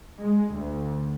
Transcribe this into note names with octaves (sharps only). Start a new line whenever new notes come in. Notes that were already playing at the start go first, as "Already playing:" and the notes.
G#3
D2